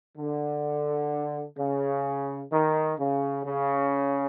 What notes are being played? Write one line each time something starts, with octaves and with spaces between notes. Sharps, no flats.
D3
C#3
D#3
C#3
C#3